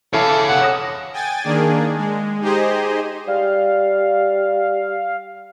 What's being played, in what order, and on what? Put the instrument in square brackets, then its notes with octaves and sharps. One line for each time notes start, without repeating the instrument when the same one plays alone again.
[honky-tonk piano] E3 E5 [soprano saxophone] A4 [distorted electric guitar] C#5 F5
[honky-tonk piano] F1 [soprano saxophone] F#5
[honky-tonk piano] D#6 A#6 E7
[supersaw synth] G5 G#5 A6
D#3 A#3 D4 G#4
G#3
D#4 G4 G#4 C5 D#5
[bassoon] G3 [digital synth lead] F5